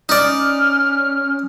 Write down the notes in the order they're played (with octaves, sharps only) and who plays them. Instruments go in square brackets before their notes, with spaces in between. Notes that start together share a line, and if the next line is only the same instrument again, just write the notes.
[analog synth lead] C#4 [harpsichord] D#4 D5 [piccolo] F6